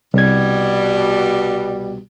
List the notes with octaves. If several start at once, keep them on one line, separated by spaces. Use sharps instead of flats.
C2 B2 G3 G#6